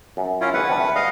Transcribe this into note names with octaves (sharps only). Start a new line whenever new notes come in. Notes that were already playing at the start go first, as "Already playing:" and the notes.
F#2
C#4 E4 F4
G#1 B4 D5 D#5 F#5
B3 C4 D4
A3
G3 D#5 F5